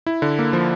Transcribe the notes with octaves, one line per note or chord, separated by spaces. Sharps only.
E4
D3
A#3
F3